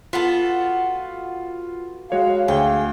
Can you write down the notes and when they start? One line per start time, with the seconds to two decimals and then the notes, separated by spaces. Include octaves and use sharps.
0.13 B3 F4 F#4 A4
2.12 G#3 F#4 C#5 F5
2.48 D2 G#4 G5